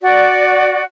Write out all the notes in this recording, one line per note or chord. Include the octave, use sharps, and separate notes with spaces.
F#4 D5